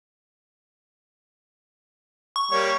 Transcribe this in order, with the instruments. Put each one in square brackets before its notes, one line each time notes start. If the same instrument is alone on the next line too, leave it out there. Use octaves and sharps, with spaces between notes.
[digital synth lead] C#6
[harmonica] G3 A#3 C#5